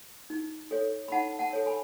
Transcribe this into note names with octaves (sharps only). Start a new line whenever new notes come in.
D#4
A4 C#5
B5
D#4 F#5 A5
F#5 A5
A4 C#5
G#5 B5